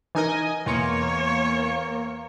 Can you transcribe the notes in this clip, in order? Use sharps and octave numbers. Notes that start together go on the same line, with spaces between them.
E3 D#4 A#4 D#5 G#5
E2 A#3 C#5 C6 C#7